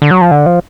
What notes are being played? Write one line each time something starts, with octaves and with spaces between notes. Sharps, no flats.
D3
F#3
F3
D3
F3